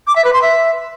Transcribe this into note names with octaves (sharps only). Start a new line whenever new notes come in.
D6
E5
B4
C6
E5